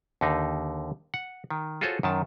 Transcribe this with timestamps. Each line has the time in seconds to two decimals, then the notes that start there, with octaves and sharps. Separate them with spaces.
0.21 D#2 D3 D#4
1.14 F#5
1.50 D#3
1.81 F4 F#4 G#4 A4 C5 C#5
2.03 F#2 D#3 A5